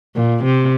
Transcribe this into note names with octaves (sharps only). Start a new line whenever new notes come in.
A#2
C3